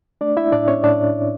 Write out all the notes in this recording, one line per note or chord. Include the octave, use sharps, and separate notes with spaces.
A3 D4 D5
E4 E5
A2 D4 D5
C#4 C#5
A2 D4 D5